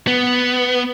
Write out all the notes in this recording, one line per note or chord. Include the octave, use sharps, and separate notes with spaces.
B3